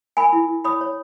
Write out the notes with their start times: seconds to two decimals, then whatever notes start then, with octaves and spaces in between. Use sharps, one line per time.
0.17 A#4 G#5 B5
0.33 E4
0.49 E4
0.64 C#5 B5 D#6
0.81 C#5